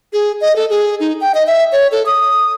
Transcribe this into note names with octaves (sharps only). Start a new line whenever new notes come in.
G#4
D#5
A4
G#4
D#4
G5
D#5
E5
C#5
A4
D#6